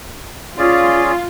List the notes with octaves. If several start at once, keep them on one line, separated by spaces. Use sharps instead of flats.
C#4 F4 G#4 D5